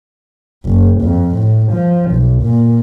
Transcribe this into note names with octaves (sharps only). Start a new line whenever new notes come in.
F#1
F2
A2
F3
B1
A#2